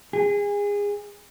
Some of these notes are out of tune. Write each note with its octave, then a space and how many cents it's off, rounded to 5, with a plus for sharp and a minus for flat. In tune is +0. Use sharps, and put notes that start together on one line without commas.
G#4 -25